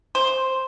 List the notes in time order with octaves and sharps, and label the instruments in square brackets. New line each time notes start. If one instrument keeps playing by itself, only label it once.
[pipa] C5